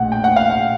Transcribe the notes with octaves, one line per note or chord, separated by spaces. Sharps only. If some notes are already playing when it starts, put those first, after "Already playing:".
Already playing: A#1 A2 F#5
G5
F#5
F5
F#5